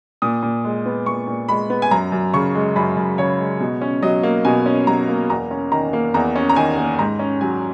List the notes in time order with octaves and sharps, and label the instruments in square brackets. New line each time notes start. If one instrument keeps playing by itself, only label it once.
[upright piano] A#2 D#6
A#2
G#3
B3
A#2 C#6
A#2
G#3 B5
B3
G#5
F#2 A#5
F#2
C#3 C#6
G#3
F#2 B5
F#2
C#3 C#5
G#3
B2
C#4
F#3 D#5
A#3
B2 G#5
C#4
F#3 A#5
A#3
E2 A#5
C#4
D#3 A#5
A#3
E2 A#5
C#4
A#5
D#3 G#5
A#3
G#2 A#5
C#4
F#3 G#5